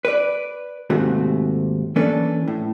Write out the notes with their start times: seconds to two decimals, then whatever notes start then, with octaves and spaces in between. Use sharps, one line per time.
0.05 B4 D5
0.90 D#2 G#2 C3 A3 F#4
1.96 E3 A#3 C#4 D4 A4 B4
2.48 A2